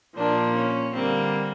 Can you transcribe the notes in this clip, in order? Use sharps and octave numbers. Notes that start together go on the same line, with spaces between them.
A#2 F3 A#3 D4
C#4
D3 G3 A#3 C4